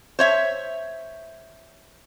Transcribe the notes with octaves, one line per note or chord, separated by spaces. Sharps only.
C5 C#5 E5